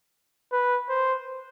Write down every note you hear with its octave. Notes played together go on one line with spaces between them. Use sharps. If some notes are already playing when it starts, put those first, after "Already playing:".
B4
C5